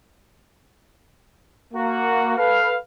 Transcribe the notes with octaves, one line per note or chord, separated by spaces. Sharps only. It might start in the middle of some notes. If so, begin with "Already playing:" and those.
A#3 F#4
A4 B4 F5